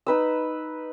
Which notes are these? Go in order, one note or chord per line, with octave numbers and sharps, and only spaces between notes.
D#4 B4 E6